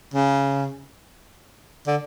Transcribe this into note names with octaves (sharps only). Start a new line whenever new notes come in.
C#3
D3